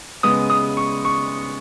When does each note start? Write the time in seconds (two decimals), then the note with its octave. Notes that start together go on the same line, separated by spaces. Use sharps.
0.23 C#3 G#3 B3 D#6
0.50 D#6
0.77 C#6
1.05 C#6